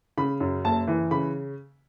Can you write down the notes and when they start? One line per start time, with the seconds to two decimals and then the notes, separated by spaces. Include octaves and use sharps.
0.17 C#3 B5
0.40 F#2
0.65 F#1 A5
0.88 E3
1.11 C#3 B5